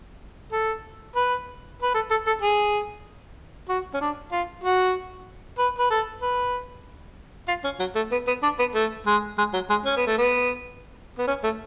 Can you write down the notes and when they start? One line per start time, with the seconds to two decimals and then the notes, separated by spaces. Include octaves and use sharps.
0.52 A4
1.16 B4
1.82 B4
1.94 A4
2.10 A4
2.26 A4
2.42 G#4
3.69 F#4
3.93 C#4
4.00 D4
4.32 F4
4.63 F#4
5.58 B4
5.78 B4
5.90 A4
6.21 B4
7.48 F4
7.64 C#4
7.79 F#3
7.95 A3
8.11 B3
8.27 B3
8.42 D4
8.59 B3
8.74 A3
9.06 G#3
9.38 G#3
9.53 F#3
9.70 G#3
9.85 C#4
9.96 B3
10.07 A3
10.18 B3
11.18 B3
11.27 C#4
11.43 A3